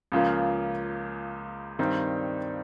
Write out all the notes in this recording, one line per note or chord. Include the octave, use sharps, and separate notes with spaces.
C#2 C#3 F3 A#3 F4
G2 D#3 G3 C4 D#4